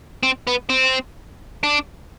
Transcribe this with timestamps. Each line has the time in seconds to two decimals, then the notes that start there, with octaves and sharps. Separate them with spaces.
0.23 C4
0.47 B3
0.70 C4
1.64 D4